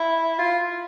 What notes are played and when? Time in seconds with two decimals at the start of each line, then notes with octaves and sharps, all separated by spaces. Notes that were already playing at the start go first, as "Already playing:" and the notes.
Already playing: E4
0.39 F4